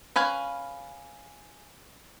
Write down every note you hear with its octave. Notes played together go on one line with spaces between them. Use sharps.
C#4 B4 F5 G#5